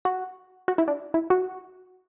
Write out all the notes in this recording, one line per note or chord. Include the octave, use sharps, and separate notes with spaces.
F#4
F#4
E4
D4
E4
F#4